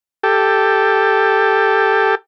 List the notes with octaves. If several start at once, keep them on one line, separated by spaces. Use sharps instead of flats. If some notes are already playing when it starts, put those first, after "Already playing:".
G4 A4